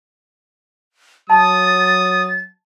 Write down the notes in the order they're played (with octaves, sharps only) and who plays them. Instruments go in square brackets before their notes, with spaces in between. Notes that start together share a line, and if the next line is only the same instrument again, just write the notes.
[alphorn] F#3 [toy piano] A5 [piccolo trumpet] D#6 [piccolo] A6